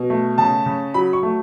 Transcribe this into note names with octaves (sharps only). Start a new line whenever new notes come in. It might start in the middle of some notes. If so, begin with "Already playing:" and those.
Already playing: B2
A3
C#3 A5
C#3
F#3 B5
C#6
A3